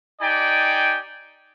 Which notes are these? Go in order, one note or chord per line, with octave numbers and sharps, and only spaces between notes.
D#4 G4 D5 G5 G#5